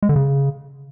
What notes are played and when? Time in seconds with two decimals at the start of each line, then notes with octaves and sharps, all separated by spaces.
0.03 G#3
0.09 D3
0.16 C#3